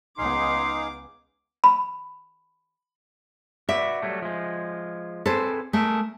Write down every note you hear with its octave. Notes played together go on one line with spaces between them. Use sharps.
C#2 B3 D#4 G#4 F5 C6 D6
B5
F#4 B4 D5 E5
F#3 G3 A3
F3 G#3
C4 G#4 A4 B4 C5
A3 G#4 A#4 E5